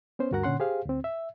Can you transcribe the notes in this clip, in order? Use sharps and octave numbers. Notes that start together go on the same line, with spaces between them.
B3 C#4 C5
D2 G2 F#4 A#4 F#5 A#5
A#2 D3 C#4 F#5 C6
G4 G#4 C5 F5
D2 C4
E5